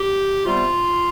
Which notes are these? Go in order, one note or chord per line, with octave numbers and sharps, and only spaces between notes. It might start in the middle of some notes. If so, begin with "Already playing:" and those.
Already playing: G4
C3 G3 B3 F4